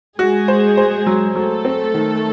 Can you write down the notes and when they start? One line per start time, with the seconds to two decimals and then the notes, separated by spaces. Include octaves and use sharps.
0.19 G#3 F#4 G#4
0.48 C5
0.77 C5
1.07 F#3
1.35 F#3 A3 A4
1.65 C4
1.94 D#3